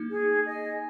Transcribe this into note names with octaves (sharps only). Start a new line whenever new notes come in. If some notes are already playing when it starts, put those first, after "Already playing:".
Already playing: A#3 D#4
G#4
D#5 G#5